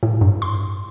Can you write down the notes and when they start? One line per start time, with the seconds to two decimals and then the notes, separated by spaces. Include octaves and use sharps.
0.03 A2
0.21 G2
0.42 C6